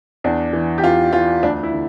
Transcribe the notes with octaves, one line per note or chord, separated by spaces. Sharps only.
E2 D4
E3
G4
E2 F4
E3 F4
D2 D4
E4
D3